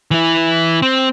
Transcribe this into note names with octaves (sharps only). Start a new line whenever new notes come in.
E3 E4
C4